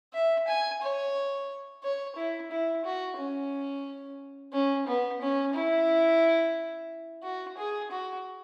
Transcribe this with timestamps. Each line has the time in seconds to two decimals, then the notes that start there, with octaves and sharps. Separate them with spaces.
0.14 E5
0.48 G#5
0.82 C#5
1.83 C#5
2.16 E4
2.51 E4
2.85 F#4
3.18 C#4
4.53 C#4
4.87 B3
5.21 C#4
5.54 E4
7.23 F#4
7.58 G#4
7.91 F#4